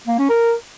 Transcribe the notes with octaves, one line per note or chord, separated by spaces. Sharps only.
A#3
C#4
A#4